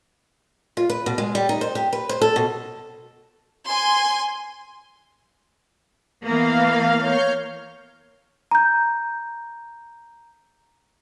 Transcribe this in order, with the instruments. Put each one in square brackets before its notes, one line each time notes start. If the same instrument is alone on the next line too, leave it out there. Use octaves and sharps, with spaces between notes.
[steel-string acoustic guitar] F4
B4
B2
G#3
G3
D#4
C5
G4
B4
C5
A4
B2
[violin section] G#5 C6
[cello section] E3 A#3 B3 [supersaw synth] F5
[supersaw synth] C#5 F6 G6
[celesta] A#5 G6